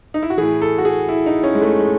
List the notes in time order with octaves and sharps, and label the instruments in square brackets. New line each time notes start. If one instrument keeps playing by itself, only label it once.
[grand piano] D#4
E4
F#4
A2 E3 G#4
A4
F#4
G#4
E4
D#4
C#4
G#3
A3
G#3